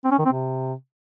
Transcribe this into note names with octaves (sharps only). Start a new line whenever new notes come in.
C4
C#4
D#3
C4
C3